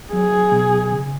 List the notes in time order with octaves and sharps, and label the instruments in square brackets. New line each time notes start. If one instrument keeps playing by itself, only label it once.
[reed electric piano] F#3 [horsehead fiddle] G#4
[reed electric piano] B2
C#3